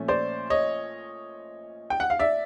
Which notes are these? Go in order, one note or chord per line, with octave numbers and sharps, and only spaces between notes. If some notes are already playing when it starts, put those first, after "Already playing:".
Already playing: A#2 F3 A3 C#4
C5 D5
C#5 D#5
G5
F#5
F5
D5 E5